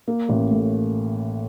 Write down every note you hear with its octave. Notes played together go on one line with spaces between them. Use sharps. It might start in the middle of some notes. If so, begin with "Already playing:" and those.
A#3
A1
A2